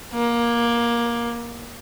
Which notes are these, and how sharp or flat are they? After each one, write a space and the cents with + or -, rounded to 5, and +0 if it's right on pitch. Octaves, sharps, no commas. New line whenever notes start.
A#3 +15